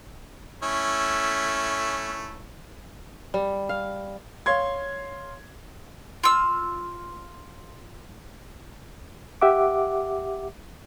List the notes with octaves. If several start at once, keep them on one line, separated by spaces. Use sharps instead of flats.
A3 C#4 E4
G3
F5
C#5 F5 C6 G#6
F4 E6
G4 E5 F#5 D6